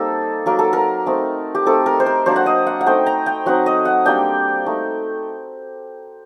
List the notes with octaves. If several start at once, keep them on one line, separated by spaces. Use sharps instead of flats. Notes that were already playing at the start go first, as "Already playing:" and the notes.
Already playing: G3 A#3 C4 D#4 A4 C5
F#3 A#3 D#4 A#4
A4
A#4
A3 C4 D#4
G4
A3 C4 D#4 A4
A#4
C5
A#4
F#3 A#3 D4 C5
F#5
D#5
F#5
F#5
A3 C4 D#4 G5
A#5
G5
F#3 C4 D#4 F#5
D#5
F#5
G3 A#3 D4 G5
A3 D#4